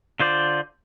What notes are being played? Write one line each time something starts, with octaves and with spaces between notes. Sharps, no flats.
D3 F4 C5 D5